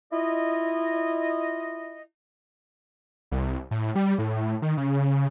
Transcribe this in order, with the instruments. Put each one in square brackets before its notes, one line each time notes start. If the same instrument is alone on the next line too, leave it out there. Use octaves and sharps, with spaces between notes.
[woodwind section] E4 F4 D#5
[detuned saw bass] C2
A2
G3
A2
D#3
C#3